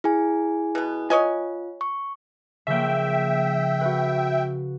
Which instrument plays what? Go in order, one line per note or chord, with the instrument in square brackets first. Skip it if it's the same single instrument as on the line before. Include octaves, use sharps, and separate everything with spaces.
[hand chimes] E4 G#4 G#5
[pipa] B2 B3
[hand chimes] F4 [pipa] C#5 D#5 G#5
[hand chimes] C#6
[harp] C#3 F3 A#3 [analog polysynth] E5 G5
[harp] F#4 B4